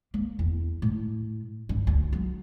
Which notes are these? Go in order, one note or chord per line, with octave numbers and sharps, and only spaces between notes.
A#3
E2
A2
G2
D2
F#3